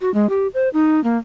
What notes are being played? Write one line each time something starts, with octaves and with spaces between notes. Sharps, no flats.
F#4
G#3
G4
C5
D#4
A#3